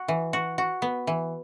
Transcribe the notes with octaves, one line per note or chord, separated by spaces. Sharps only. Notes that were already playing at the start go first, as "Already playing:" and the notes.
Already playing: F#4
E3
F#4
F#4
B3
E3